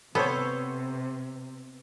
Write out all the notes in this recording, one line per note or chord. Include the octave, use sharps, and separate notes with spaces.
C3 B3 A4 C5 C#5